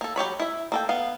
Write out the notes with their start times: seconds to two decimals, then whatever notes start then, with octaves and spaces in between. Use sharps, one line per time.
0.01 A#3 A4
0.16 F#3 G4 C#5 B5
0.40 E4 E5
0.72 A#3 A4 G5
0.89 B3 F5